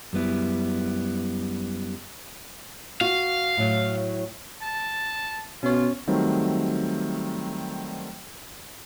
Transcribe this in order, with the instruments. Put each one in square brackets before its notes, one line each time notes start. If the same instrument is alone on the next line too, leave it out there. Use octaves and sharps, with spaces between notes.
[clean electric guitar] F#2 G3 B3 E4
[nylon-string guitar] F#4 [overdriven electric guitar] F5
[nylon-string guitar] A2 F#3
[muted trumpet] A5
[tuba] B2 [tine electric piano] C#4 C#5 [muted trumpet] F4
[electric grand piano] D#3 F#3 G3 A3 C4